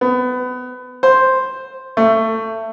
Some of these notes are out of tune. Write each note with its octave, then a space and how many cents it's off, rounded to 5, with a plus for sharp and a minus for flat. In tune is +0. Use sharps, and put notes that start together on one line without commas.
B3 +25
C5 +0
A3 +20